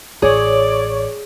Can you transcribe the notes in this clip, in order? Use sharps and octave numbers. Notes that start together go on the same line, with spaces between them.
A1 G#4 C#5 D5